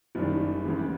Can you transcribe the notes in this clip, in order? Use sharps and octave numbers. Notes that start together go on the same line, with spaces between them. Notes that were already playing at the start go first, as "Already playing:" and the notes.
F#1 F#2 D#3 G3
D2 C#3 E3 G#3